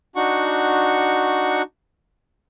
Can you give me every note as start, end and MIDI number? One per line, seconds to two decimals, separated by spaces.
0.16 1.62 62
0.16 1.62 63
0.16 1.62 66
0.16 1.62 78
0.16 1.62 85